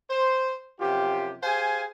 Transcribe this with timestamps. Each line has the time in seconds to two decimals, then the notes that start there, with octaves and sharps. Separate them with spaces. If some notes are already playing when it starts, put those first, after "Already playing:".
0.10 C5
0.80 F#2 C3 F3 F4 G4
1.43 G4 G#4 C5 F5 G#5